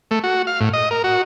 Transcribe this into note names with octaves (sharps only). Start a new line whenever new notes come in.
A3
F#4
F5
A2
D#5
A#4
F#4